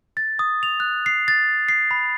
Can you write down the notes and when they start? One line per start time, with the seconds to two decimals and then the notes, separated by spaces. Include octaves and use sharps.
0.17 A6
0.39 D#6
0.63 F7
0.80 F#6
1.06 C7
1.28 A6
1.68 C7
1.91 B5